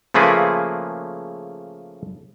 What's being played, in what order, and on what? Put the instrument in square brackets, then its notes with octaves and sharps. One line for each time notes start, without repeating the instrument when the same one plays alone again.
[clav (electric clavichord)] C#3 F3 A3 A#3 G#4 B4